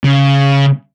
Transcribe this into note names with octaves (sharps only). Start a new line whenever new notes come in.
C#3